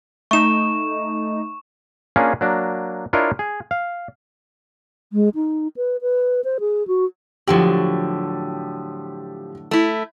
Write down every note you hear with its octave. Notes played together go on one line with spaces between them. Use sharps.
A3 D#4 C#6 E7
A#3 C#4 D4 F4 G#4
F#3 A#3 D4
D4 E4 F4 A#4 C#5 D#5
G#4
F5
G#3
D#4
B4
B4
C5
G#4
F#4
A2 D3 F3 F#3 G4
A3 E4